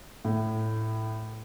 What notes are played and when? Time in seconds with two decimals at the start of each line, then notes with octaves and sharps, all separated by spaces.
0.25 A2